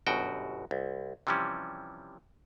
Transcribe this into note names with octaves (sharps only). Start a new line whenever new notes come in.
G1 F#2 B2 F#4 G5
C2
C3 E3 F3 G3 C#4